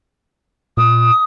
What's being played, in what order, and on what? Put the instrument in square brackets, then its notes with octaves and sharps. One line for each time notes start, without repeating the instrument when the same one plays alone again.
[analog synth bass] A#2 [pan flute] D#6